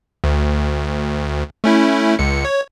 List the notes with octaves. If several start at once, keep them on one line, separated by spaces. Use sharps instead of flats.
D2
A3 C#4 E4
C#2 C#7
C#5